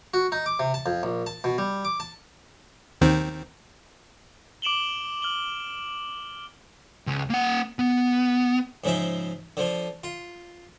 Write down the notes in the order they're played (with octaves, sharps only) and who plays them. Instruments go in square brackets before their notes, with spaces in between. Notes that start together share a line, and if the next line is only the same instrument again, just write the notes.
[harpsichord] F#4
D#4
D6
C3
A5
F2
A#1
A5
B2
G3
D6
A5
[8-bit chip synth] D#2 D#3 C4
[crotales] D6 D7 E7 F#7 G7
F6 F#7 G7
[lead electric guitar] C#2
A#3 F#5
B3
[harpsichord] G#2 C#3 F3 E5
D3 F3
F4